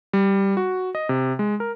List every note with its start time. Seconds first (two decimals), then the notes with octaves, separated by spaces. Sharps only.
0.13 G3
0.57 F#4
0.95 D#5
1.09 C3
1.39 G#3
1.60 A#4